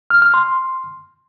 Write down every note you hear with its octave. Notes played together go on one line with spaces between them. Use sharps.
F6
F6
C6